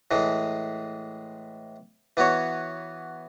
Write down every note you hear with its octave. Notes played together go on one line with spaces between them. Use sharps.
A2 E3 G#3
E3 B3 F#4 C#5